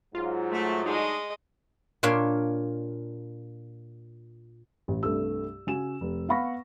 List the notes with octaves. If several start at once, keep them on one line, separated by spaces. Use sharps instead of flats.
G#2 F#3 F4
A3
G#3 A3 D4 D#4 D#5
A#2 D4 C#5 F5
A1
C2 G2 A3 E6
C#3 F#4 G#5 E7
F1
B3 F5 F#5 B5 C#6 A#6